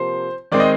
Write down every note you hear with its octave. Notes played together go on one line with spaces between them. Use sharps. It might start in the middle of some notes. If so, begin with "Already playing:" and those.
Already playing: C3 F3 A#3 C5
D#3 G#3 C4 D5
D#5